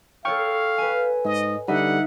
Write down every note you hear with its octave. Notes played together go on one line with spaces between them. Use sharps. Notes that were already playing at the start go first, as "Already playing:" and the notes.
A4 C#5 F5 G5 C#6 F6 G#6
B4 G#5
G#2 D#5
D3 G3 D#4 E5 F#5